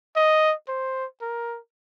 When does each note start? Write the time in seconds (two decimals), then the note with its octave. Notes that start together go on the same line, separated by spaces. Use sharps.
0.16 D#5
0.68 C5
1.21 A#4